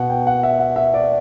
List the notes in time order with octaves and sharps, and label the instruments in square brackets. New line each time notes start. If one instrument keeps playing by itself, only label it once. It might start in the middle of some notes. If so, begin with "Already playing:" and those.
Already playing: [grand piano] B2 F#5
G5
F#5
E5
F#5
E5
D5